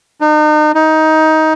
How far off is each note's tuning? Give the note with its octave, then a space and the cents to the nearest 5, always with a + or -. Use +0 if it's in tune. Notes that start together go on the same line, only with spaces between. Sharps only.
D#4 -40
D#4 +15